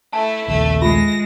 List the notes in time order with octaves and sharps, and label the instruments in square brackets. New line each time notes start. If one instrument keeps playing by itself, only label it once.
[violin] A3 E4 [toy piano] A5
[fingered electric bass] A#1 D#2 [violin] A3
[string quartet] G#3 [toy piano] F4 [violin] A#6